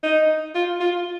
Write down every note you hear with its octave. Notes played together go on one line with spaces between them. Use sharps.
D#4
F4
F4